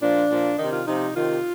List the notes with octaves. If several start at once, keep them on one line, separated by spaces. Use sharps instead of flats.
A#2 F3 D4
A#2 F3
C3 D#3 D#4
F4
C3 F3 D#4
C3 D#3 F4